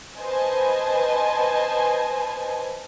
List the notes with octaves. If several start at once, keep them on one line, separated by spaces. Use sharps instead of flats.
B4 C5 D#5 G#5 A5